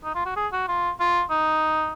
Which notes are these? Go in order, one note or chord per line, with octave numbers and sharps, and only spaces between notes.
D#4
F4
F#4
G#4
F#4
F4
F4
D#4